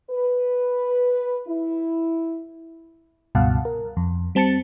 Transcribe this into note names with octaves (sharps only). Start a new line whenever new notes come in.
B4
E4
C#2 G2 B2 F5 F#5 A5
A#4
F2
G3 C4 A5 A6 C#7